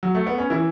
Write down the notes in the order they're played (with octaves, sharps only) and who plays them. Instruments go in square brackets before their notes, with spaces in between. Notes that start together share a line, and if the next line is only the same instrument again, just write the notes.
[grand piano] F#3
A3
B3
C#4
E3 E4